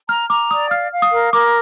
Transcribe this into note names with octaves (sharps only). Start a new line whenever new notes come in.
A#5 F6
A#5 D6
D5 D#6
F5 F6
F5
D#6
A#4
A#4 D6